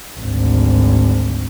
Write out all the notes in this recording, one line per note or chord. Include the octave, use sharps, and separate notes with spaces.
G#1 D2